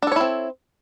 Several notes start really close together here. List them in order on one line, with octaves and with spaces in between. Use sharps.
D4 A4 C#5 E4 C4